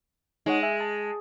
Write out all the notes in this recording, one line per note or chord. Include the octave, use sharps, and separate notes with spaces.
G#3 D#4 C#5 F#5
E5 G#5
A5